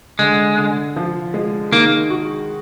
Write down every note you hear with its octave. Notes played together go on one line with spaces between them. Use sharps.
D3 G#3
D3
F3
G#3
D#3 A#3
F#4